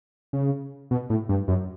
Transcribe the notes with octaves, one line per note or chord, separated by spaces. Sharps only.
C#3
B2
A2
G2
F#2